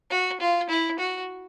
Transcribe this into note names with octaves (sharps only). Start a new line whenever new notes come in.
F#4
F4
E4
F#4